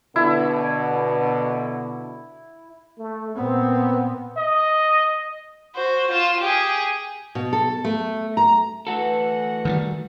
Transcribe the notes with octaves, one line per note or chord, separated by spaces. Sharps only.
B2 D3 E4
A3
A#2 B3 C4
D#5
F#4 C5
F4 E7
G4 G#4
B2
A4
A3
A#5
E3 A3 F#4 A4 F#5
D#3 F3 G3